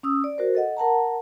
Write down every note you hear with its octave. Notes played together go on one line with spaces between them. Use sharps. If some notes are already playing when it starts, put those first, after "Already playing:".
C#4 D#6 E6
D5
F#4 A#4 C5
A4 D#5 F#5
A#4 F#5 A5 A#5